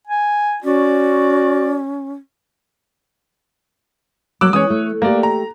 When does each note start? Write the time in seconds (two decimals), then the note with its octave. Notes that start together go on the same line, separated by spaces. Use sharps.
0.07 G#5
0.64 C#4 F#4 D5
4.41 F#3 A#3 D6 E6 F#6
4.53 E3 G#3 C#4 C#5 D#6
4.70 A3
5.02 A3 A#3 G4 D5
5.23 A#5